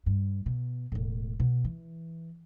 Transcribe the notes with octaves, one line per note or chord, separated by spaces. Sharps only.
G2
B2
E1 A2
B2
E3